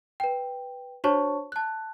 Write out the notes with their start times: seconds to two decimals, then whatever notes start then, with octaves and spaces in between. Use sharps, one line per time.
0.20 B4 G5
1.04 D4 F#4 C5 C#5 A5 C#6
1.52 A5 F#6